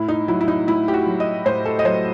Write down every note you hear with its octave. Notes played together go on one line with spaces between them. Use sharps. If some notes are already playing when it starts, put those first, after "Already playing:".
Already playing: A2 E4
D#4
F#3 E4
E4
D#4
A2 E4
G4
F#4
F#3
D#5
A2 C5
A4
D#5
F#3 C5